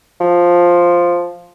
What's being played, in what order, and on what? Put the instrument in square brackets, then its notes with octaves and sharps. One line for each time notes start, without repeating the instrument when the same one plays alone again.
[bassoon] F3